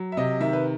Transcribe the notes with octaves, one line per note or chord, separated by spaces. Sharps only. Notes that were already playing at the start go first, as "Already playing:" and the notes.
Already playing: F#3
E5
C3 D#5
D#3 E5
B4